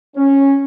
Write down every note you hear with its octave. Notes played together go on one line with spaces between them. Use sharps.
C#4